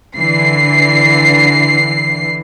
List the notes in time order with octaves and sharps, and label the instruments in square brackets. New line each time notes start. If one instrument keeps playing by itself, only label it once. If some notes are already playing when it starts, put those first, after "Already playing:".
[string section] D3 E3 C7